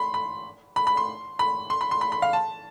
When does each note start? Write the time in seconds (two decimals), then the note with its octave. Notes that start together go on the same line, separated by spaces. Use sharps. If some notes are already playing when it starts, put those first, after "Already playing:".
Already playing: B5 C6
0.14 B5
0.76 B5
0.87 B5
0.97 C6
1.39 B5
1.70 C6
1.81 B5
1.91 C6
2.01 B5
2.12 B5
2.22 F5
2.33 A5